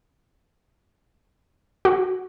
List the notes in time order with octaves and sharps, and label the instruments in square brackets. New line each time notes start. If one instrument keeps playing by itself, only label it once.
[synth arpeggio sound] F#4